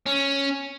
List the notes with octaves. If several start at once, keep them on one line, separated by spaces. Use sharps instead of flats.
C#4